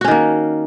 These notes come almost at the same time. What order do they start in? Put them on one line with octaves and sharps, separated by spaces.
F#4 C#4 D#3 A#3